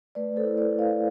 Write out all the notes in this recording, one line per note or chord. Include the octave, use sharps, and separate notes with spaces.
A3 B4 D5
A4 C5
E4
B4 D5
E4
D5 F5